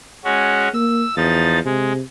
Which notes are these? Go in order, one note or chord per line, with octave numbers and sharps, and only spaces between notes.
G#3 C#4 F#4
A#3 E6
E2 F3 D#4 A6
C3 G#3